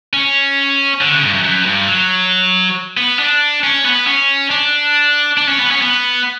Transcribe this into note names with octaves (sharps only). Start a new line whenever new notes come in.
C#4
D3
C#3
G2
F#2
F#2
G2
F#3
B3
D4
C#4
B3
C#4
D4
D4
C#4
B3
C#4
B3